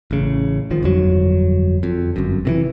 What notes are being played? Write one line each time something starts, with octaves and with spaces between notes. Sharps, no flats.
A1 C#3
G1 D#3 F3
G1 F2 F#3
F2
G1 F#2
C3 D#3 E3